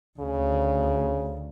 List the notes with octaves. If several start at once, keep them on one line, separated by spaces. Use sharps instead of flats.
D2 C#3